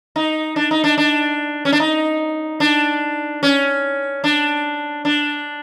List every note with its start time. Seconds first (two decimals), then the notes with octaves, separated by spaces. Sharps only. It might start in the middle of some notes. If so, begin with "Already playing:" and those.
0.16 D#4
0.56 D4
0.71 D#4
0.84 D4
0.98 D4
1.65 C#4
1.72 D4
1.80 D#4
2.60 D4
3.43 C#4
4.24 D4
5.05 D4